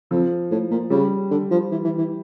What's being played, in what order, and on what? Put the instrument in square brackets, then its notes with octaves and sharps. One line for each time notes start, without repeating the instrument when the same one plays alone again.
[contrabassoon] F2 [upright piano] F3
[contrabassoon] A2
A#2
[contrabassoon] C#3 [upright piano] G3
[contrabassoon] D3
F3
E3
E3
E3